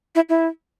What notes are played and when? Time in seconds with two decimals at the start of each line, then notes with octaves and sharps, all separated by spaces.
0.15 E4
0.29 E4